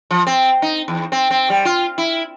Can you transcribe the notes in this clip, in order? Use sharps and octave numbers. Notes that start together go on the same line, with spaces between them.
F3
C4
D#4
E2
C4
C4
G3
F4
E4